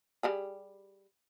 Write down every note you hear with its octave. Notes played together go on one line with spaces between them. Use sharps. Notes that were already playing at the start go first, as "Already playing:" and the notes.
G3 G4 G#4